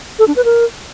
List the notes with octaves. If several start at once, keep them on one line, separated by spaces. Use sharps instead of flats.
A4
D4
B4
A#4